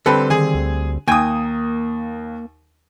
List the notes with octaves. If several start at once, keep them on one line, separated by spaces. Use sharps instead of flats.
D3 G3 C4 A4 B4
D#3 G#4 G#5
D2
D#2 A#3 G5 G#5 D#6